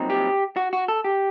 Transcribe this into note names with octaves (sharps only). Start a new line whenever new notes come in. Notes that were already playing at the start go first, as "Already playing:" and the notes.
Already playing: C2 A#2 F#3 C4 D#4
G4
F#4
F#4
A4
G4